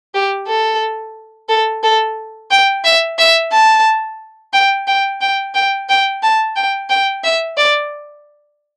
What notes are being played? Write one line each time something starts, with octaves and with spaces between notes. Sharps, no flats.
G4
A4
A4
A4
G5
E5
E5
A5
G5
G5
G5
G5
G5
A5
G5
G5
E5
D5